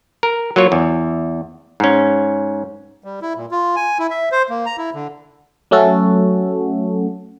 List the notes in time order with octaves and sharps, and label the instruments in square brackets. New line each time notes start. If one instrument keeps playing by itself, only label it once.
[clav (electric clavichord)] A#4
F#3 A#3 F4 C#5
E2
G#2 C#4
[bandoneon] G3
E4
A#2
F4
G#5
E4
E5
C5
A#3
A#5
E4
D3
[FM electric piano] F#3 A3 C#4 F#4 A4